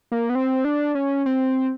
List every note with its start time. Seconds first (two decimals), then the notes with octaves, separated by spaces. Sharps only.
0.12 A#3
0.30 B3
0.35 C4
0.64 D4
0.95 C#4
1.26 C4